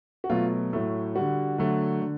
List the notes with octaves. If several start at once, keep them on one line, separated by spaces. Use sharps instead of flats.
F#4
B2 F#3 A3 F4
A2 F#3 A3
D3 G3 F#4
D3 F#3 A3
D3